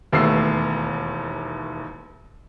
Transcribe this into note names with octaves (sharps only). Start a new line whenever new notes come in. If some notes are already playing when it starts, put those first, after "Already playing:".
E1 D#2 A3 B3 E6 C7